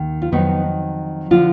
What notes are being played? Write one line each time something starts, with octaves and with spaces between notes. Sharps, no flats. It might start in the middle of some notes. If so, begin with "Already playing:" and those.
Already playing: D#2 D#3
F4
F2 D#3 F#3 B3 D#4
D3 F3 D4 F4